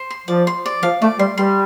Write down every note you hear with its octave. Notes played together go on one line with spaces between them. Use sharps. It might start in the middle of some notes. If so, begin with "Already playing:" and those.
Already playing: C5
C6
F3 D5
C6
D5
F3 F5
A3 D5
G3 C6
G3 C6